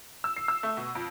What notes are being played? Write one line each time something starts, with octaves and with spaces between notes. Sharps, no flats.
E6
C7
E6
A3
B2
F2